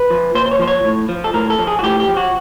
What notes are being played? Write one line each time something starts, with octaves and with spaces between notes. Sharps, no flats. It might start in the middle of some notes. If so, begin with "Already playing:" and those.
Already playing: B4
F3
A#2 C5
C5
C#5
F3 C5
C#5
A2
F3
A4
A2 A#4
A4
F3
G#4
F#4
A2 G4
G4
F3
F#4